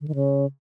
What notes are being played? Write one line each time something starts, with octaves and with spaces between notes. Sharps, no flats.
D3
D#3
C#3